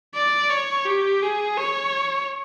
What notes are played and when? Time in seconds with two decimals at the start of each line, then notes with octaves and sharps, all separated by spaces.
0.15 D5
0.50 C#5
0.85 G4
1.22 G#4
1.57 C#5